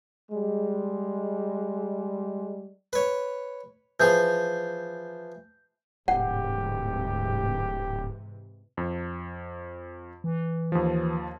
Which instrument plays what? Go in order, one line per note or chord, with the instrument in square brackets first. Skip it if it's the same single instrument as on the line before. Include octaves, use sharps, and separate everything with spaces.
[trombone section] G3 G#3
[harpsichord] B4 C#5
[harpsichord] E3 F3 G#4 [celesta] G6
[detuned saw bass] D1 [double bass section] G#2 C3 E3 [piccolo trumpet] G4 [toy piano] F#5
[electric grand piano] F2
[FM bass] E3
[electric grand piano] D#2 F3